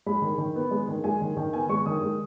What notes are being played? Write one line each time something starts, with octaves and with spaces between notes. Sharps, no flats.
G#3 B5
D#3
D#3
B3
G#3
D#3
G#3 G#5
D#3
D#3
B3 G#5
G#3 C#6
D#3 D#6
G#3